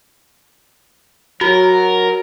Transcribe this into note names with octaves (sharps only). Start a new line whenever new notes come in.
F#3 F#4 A#4